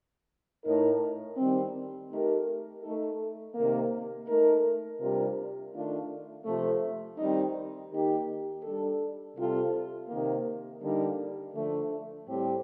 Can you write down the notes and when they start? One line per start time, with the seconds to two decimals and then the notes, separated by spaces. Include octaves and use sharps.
0.64 A2 A3 D#4 A#4
1.37 D#3 G3 C4
2.10 A3 D#4 G4 A#4
2.83 A3 D#4 A4
3.55 C3 D#3 A#3
4.28 A3 D#4 A#4
5.00 C3 G3 D4 F4 A#4
5.73 D#3 A3 D4 F4
6.45 C3 F3 A3
7.18 D#3 G3 C4 D#4
7.90 D#3 A#3 D#4 G4
8.63 G3 D4 A4
9.36 C3 G3 C4 F4 A4
10.09 C3 D#3 A#3
10.81 D3 G3 A#3 D#4 A#4
11.54 D3 F3 A3
12.27 A2 G3 C4 G4